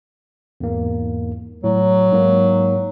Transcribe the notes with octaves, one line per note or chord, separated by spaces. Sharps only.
E2 G#2 A#3
A2 F#3
G#2 A#3